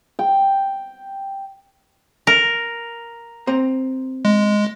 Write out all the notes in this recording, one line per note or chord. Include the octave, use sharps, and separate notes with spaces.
G5
A#4
C4 A#5
G#3